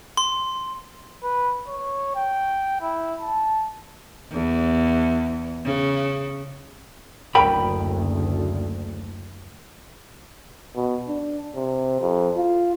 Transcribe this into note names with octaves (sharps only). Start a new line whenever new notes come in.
C6
B4
C#5
G5
E4
A5
E2
C#3
F#1 D2 A#4 G5 B5
B2
D4
C3
F2
F4